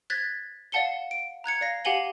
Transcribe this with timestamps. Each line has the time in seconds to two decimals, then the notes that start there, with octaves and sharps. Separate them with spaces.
0.10 F#6 G#6 A6 B6
0.72 D5 F5 F#5 A5 C#7 G7
1.11 D7
1.44 A#5 F#6 G#6 C#7
1.61 D5 F5 A#6
1.85 G4 F5 F#5 G#5 F#7 G7